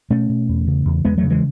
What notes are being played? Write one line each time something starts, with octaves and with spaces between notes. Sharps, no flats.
B2 A3 C#4
B2
E2
C#3
E2
E2 G#3 B3
F#3 A3
C#3
E3 G#3